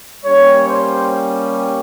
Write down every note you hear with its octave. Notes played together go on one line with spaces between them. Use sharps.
G3 A#3 C#4 G4 C#5
C5